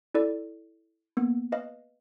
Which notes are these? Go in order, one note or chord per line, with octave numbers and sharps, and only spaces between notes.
E4 A4 D5
A#3 B3
B4 D#5 F5